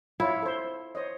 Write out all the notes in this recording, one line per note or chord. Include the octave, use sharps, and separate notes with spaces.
E4 F4 C#5 E5
A4 C5
C5 C#5 D#5